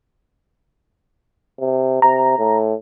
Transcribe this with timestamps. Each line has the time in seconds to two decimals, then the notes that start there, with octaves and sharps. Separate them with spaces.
1.60 C3
2.02 C3 A#5
2.38 A2